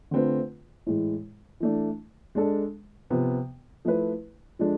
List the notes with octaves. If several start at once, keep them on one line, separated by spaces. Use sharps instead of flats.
D3 A3 C4 F4 B4
A2 E3 G#3
E3 A3 D4
G#3 D4 A4
C3 F3 B3
F3 A3 E4 B4
F3 G#3 D4 A4